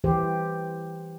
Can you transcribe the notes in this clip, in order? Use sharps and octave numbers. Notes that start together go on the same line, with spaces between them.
E3 G4 C5